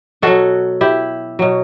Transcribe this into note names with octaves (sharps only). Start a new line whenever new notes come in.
B2 F#3 F#4 A4
E4 G4
B2 F#3